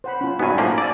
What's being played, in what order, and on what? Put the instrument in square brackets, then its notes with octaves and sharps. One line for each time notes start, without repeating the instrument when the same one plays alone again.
[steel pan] C5 F#5 B5
C#4 F4
[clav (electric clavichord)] G2 B3 [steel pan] D#4 F#4 G#5
[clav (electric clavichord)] A2 F3 A#3
[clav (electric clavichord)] D5 [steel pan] E5 G#5 A5